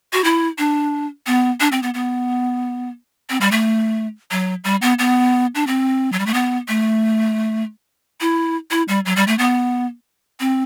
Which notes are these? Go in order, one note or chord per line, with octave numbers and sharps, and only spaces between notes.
F#4
E4
D4
B3
D4
C4
B3
B3
C4
G3
A3
F#3
G3
B3
B3
D4
C4
F#3
G3
A3
B3
A3
E4
E4
G3
F#3
G3
A3
B3
C4